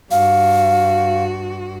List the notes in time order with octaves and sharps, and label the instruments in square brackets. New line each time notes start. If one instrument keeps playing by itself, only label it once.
[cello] G2 F#4 [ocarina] F5